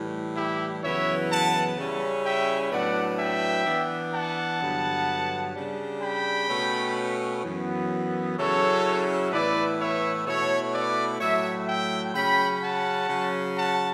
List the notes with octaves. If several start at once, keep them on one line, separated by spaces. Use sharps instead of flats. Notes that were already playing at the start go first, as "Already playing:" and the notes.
Already playing: A2 E3 G3
E4 G4
F#2 C#3 E3 B3 E4 C#5 E5
F#5 A5
C#3 G3 C#4 E4
E5 G5
A2 F#3 B3 D4 D5 F#5
E5 G5
E3 B3 D4
F#5 A5
G2 D3 F#3 B3
C#3 G3 D4
G5 B5
B2 A3 C#4
F#2 E3 B3
C#3 F#3 C#4 E4 A4 C#5
A2 E3 B3 E4 B4 D5
C#5 E5
B2 A3 E4 A4 C#5
B4 D5
A2 F#3 A3 C#5 E5
E5 G5
C#3 F#3 C#4 G5 B5
F#5 A5
C#3 F#3 C#4
F#5 A5